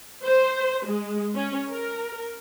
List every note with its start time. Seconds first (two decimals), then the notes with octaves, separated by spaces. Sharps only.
0.23 C5
0.86 G#3
1.35 C#4
1.70 A#4